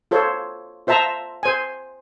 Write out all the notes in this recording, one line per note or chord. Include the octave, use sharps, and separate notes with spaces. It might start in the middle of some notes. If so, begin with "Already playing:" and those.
F4 A4 C5 C#5
F4 C5 E5 A5 A#5
C5 G#5